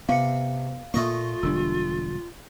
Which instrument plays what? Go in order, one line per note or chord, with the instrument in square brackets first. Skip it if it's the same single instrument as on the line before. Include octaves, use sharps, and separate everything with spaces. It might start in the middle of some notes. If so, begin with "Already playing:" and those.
[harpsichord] C3 [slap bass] B3 [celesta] F5 C#7
[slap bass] A#2 A#3 [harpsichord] A3 D#5 C#6 [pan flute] F4
[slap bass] E1 D3 G3 [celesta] D4 E6